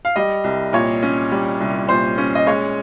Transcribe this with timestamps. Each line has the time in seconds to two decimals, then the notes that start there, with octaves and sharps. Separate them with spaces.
0.05 F5
0.16 G3 D#5
0.44 C2
0.73 A#2 C#5
1.03 C#4
1.32 G3
1.61 C2
1.89 A#2 C5
2.18 C#4
2.35 D#5
2.47 G#3 C#5